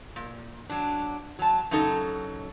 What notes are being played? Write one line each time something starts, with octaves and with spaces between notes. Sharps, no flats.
A#2
F#3 D4
F#3 A5
F#2 C#3 F#3 D#4 A4